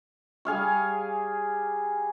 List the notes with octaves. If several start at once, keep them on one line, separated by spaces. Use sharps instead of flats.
G3 G#4 F5 C#6